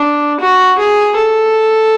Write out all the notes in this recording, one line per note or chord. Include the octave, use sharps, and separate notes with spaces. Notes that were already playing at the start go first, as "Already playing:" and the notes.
Already playing: D4
F#4
G#4
A4